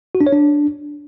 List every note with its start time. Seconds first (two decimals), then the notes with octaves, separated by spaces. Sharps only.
0.15 F#4
0.21 D4
0.27 C#5
0.32 D4